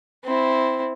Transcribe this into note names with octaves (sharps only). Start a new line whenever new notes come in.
C4 E4